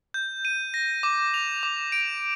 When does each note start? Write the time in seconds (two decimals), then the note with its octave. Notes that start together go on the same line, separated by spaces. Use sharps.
0.14 G6
0.45 D#7
0.74 A#6
1.03 D6
1.34 F7
1.63 D6
1.92 D7